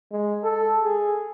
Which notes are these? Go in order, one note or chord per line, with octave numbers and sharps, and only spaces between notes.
G#3
A4
G#4